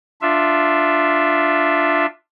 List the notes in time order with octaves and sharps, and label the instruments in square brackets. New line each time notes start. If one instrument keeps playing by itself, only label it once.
[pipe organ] D4 F4 E5